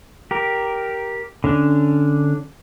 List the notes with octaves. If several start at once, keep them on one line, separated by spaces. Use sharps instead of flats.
G4 A#4
D3 C#4 D4